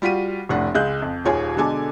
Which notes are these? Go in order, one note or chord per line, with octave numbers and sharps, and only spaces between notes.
G3 F4 F#4 B6 D#7
F1 A2 D4 F#5
C#2 G#3 F#6 G6
F2
D#1 D#2 F4 G#4 C#5 G#5
B2 D3 G#3 A4 G#5 D6